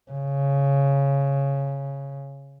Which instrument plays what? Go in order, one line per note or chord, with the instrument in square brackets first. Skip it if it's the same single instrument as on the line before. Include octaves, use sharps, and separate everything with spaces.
[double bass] C#3